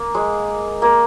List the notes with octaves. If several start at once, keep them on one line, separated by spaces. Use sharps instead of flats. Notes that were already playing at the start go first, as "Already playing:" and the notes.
Already playing: A#3
G#3
A#3